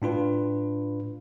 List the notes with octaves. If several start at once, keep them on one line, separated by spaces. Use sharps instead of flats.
A2 D4 F4 B4